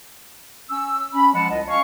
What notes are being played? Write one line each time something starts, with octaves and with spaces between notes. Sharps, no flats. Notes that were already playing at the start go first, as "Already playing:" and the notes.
C#4 E6
C#4 B5
F3 G#3 F#5 A5
C2 F4 D#5
C#4 C#5 F5 C#6